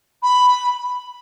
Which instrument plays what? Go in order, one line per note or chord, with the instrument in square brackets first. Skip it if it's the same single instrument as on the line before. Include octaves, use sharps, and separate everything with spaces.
[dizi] B5